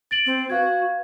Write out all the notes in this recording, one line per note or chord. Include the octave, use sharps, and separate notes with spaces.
A6 D7 F#7
C4
F#4 B4 F5 G#6